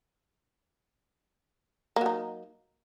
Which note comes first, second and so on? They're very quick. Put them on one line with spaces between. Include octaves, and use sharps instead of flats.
A#3 F#3 D#4